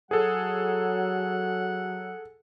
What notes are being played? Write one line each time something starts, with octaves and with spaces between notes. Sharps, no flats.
F#3 G#4 A4 F#5